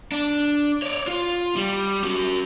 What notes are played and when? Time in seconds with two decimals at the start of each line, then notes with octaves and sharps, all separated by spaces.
0.12 D4
0.82 C#5 D5
1.07 F4
1.56 G3
2.04 C#4 F#4